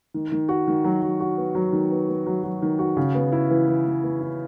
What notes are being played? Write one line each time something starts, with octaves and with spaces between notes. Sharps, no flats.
D#3
D#3
F#4
D#3
F#3
F#3
F#4
B3
F#3
D#3
B3
B3
F#3
F#3
D#3
F#4
C#3
B3
E4
E3
E3
E3
B3
E4